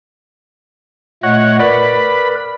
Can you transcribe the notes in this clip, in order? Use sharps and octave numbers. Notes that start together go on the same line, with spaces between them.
A#2 A3 C#5 D#5 F#5
A#4 B4 D5 B5